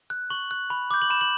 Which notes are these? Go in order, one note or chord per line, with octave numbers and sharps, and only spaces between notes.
F#6
C#6 F#7
F#6
B5
D6 G6
F#7
B5 E7
F#7